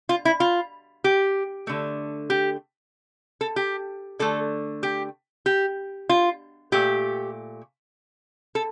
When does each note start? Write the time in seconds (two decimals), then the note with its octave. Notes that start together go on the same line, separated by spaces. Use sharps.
0.09 F4
0.25 E4
0.40 F4
1.04 G4
1.67 D3 A3
2.30 G4
3.41 A4
3.56 G4
4.19 D3 A3 A4
4.83 G4
5.46 G4
6.09 F4
6.72 A#2 A3 G4
8.55 A4